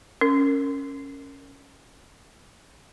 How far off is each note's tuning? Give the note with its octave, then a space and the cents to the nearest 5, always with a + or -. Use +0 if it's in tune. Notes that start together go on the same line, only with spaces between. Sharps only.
C#4 +0 A#4 -20